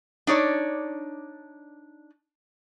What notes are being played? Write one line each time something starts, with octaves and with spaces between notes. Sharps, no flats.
D4 D#4 C#5 D5